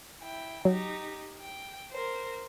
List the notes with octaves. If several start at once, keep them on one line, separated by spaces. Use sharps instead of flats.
E4 G5
F#3 D#4 G4
G5
A#4 C5